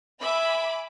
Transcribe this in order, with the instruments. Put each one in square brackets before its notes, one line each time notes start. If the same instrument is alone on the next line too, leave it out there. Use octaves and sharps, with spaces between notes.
[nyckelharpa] E5 [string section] G#5 B5 D6